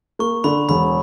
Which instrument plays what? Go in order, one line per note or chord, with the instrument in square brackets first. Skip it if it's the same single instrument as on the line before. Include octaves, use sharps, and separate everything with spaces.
[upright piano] A#3 [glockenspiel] C#6
[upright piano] D3 [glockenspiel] B5
[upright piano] E1 [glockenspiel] B5